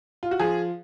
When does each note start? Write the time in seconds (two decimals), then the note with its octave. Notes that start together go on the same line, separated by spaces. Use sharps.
0.23 F4
0.31 F#4
0.40 F3 G#4